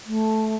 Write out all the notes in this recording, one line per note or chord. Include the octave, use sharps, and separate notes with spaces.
A3